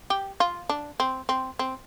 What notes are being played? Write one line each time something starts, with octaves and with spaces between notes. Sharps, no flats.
G4
F4
D4
C4
C4
C4